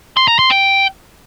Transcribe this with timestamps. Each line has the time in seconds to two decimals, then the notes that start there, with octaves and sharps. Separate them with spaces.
0.17 C6
0.28 A#5
0.39 C6
0.50 G5